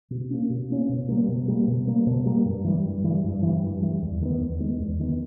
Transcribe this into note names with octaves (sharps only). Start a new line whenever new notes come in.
B2
A#3 C#4
B2
A#3 C#4
B2
G3 A#3
B2
G3 A#3
B2
G3 A#3
B2
G3 A#3
G2
E3 G3
G2
E3 G3
G2
E3 G3
G2
E3 G3
E2
D#3 G#3 B3
E2
D#3 G#3 B3
E2
D#3 G#3 B3